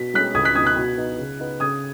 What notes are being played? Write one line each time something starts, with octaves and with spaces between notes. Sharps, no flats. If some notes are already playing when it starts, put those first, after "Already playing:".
Already playing: B2 B6
G#3 C#4 F#6 B6
C#2 D#6 G#6
F#6 B6
B2 F#3 D#4 D#6 G#6
F#6 B6
B2
B3 D#4
C#3
B3 D#4
C#3 D#6 G#6